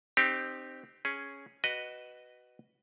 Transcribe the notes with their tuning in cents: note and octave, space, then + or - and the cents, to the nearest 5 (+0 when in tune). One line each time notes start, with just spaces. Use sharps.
C4 +0 D#4 -30 G4 +0
C#4 +0 G#4 +0
F#4 +15 B4 +0 D#5 -10